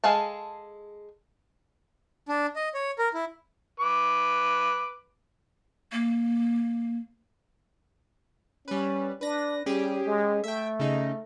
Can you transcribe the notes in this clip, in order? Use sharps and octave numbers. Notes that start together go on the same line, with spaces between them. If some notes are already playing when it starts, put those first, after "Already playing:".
G#3 G#4 A4 F5 A5
D4
D#5
C#5
A#4
E4
B4 D6
A#3
G3 C#4 B4
D4 B4 A#6
G3 C#4 G4 G#4
G#3
A3 E5 G5
C#3 D#4